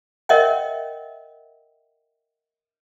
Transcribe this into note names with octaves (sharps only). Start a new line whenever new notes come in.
A#4 C#5 D#5 E5 F#5 G5